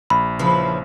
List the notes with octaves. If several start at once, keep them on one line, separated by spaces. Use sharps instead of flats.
A#1 B5
C#3 F3 E4 B4